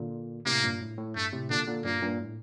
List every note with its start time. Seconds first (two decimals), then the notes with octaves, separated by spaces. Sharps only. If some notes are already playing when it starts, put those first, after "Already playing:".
Already playing: A#2 D3
0.46 A2 C3 A#3
0.63 G2 A#2
0.81 A2
0.98 A2
1.15 G2 A3
1.33 A2 C3
1.50 A#2 D3 D4
1.67 A#2 D3
1.84 G2 A#2 A#3
2.02 G2 A#2
2.19 A2